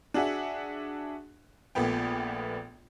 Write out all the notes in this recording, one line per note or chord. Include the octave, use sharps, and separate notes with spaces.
D4 F#4 G#4 E5 F#5
A#1 A#2 A3 B3 G5